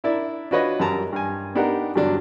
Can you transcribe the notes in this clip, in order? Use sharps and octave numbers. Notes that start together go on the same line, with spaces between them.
D4 E4 A#4 D5 E5
D4 F4 F#4 B4 C#5 D#5
F#2 G3 A#4 A5 A#5
G2 G#5
B3 D4 D#4 G4 A#4 F#5
G2 D3 F#3 D4